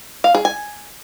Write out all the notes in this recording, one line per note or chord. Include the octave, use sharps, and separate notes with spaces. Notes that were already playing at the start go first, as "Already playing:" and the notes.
F5
G#4
G#5